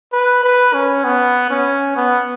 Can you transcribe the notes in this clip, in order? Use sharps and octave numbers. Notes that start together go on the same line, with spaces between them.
B4
B4
C#4
B3
C#4
B3